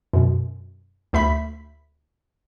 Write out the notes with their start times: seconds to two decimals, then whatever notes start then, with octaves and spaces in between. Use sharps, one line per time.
0.13 F#2 B2
1.13 D2 A3 E5 B5 B6